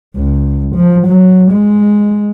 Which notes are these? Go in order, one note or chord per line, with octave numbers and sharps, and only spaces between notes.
C#2
F3
F#3
G#3